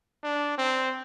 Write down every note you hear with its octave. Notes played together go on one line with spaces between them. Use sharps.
D4
C4